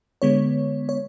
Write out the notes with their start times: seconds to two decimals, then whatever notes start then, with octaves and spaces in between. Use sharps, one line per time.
0.22 D3 G#3 B3 C#5
0.89 C#5